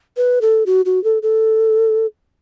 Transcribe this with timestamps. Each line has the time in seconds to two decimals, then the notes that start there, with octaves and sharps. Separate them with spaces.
0.17 B4
0.41 A4
0.66 F#4
0.86 F#4
1.04 A4
1.23 A4